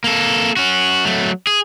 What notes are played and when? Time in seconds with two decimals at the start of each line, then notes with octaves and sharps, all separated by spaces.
0.04 A#3 A4
0.57 C#4 F#4
1.05 F#3 A3
1.47 G#4